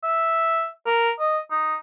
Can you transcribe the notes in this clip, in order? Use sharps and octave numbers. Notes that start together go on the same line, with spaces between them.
E5
A#4
D#5
D#4